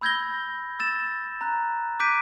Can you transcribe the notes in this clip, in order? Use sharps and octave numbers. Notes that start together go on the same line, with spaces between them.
B5 E6 G6 G#6 A#6 G7
E6 A6 E7
A#5 F#6
D6 F#6 G6 B6 D7 D#7